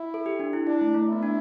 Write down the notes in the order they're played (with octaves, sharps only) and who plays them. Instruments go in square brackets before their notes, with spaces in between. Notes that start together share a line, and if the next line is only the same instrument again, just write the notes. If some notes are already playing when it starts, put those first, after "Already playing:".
Already playing: [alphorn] E4
[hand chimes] A4
G4
D4
E4
[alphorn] D4 [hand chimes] E4
[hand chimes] A3
A3
[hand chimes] B3 [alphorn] E4
[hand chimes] D4